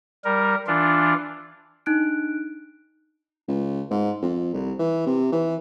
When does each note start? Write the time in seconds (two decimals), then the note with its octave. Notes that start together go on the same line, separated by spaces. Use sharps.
0.24 G3 A#4
0.67 E3 D4 F4
1.86 D4 D#4 F#6 D7
3.48 C#2
3.91 G#2
4.22 F2
4.54 C2
4.79 E3
5.06 C3
5.32 E3